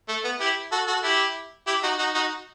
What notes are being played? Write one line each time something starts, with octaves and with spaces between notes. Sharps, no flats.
A3
B3
E4 G4
F#4 A4
F#4 A4
E4 G4
E4 G4
D#4 F#4
D#4 F#4
D#4 F#4